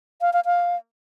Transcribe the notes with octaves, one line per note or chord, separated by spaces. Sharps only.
F5
F5
F5